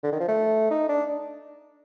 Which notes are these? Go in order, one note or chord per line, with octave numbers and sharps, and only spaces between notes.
D3
D#3
F3
A3
D#4
D4